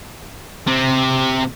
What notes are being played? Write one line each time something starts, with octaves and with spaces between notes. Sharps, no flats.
C3 C4